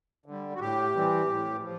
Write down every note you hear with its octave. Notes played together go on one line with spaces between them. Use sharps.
D3 G3
F#4
A2 G4
E3 G3 C4
A2
F3